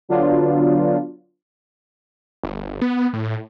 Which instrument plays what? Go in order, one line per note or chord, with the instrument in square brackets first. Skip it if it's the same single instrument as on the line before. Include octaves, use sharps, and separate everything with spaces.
[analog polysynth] D3 F#3 B3 D4 F4
[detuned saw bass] G1
B3
A2